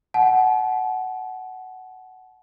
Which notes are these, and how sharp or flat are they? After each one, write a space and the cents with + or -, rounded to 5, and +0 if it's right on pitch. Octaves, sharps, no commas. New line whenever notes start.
F#5 +10 A5 -40